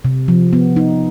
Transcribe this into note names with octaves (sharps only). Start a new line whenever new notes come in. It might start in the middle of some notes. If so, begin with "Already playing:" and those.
C3
F3
B3
D#4